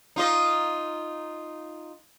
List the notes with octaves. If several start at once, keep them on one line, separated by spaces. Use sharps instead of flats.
D#4 F4 D#5